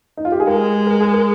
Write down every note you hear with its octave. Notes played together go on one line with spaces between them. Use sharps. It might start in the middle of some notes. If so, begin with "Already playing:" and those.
D#4
F4
G4
G#4
G#3 A#4
A#4
G#4
A#4